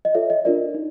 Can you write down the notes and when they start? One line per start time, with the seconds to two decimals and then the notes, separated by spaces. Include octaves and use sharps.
0.05 D#5
0.14 F4 A4 C#5 E5
0.30 D#5
0.45 D4 F4 A#4 D5
0.74 D#4